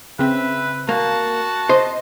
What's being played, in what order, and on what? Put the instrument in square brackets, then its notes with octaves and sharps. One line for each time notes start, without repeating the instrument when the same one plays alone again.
[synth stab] C#3 C4 [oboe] B4 [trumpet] E5
[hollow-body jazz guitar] A#3 [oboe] F#4 [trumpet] A5
[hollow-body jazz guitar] C5 [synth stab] D#5